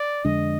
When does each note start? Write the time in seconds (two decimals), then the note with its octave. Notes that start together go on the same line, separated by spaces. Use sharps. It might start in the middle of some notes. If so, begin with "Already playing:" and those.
Already playing: D5
0.25 F2 D3 G#3 D4 D#5